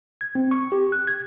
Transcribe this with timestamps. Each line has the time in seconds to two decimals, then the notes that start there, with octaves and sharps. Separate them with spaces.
0.21 G#6
0.35 C4
0.51 C#6
0.72 G4
0.92 F#6
1.07 G#6